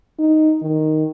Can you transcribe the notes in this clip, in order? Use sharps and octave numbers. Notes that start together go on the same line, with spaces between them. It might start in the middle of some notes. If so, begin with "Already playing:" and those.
D#4
D#3